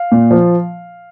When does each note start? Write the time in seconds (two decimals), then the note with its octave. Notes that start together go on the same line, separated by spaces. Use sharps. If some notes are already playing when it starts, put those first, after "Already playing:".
Already playing: F5
0.12 A#2
0.31 F3